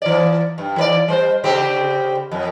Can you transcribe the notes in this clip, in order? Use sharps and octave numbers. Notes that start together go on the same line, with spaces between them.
E3 D5
G2
E3 B4 D5
G3 C5
C#3 C4 G4
F2